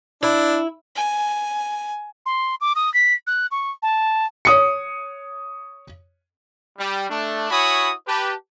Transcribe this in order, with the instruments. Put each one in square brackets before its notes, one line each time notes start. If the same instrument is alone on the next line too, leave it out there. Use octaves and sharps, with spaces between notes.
[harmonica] D4 [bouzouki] E4
[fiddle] G#5
[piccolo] C6
D6
D#6
B6
F#6
C#6
A5
[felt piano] C#5 D#6 C#7
[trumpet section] G3
A3 D4
E4 F#4 C#5 G#5 B5 D#6
G4 B4 A5